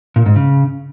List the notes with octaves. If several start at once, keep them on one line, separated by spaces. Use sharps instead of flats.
A#2
G#2
C#3